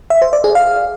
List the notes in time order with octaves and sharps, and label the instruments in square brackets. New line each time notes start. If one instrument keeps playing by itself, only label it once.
[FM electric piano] E5
C5
D5
G#4
F5